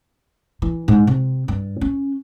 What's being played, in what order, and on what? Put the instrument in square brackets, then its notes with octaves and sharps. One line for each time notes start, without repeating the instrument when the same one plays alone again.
[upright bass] E3
G#2
C3
G2
C#4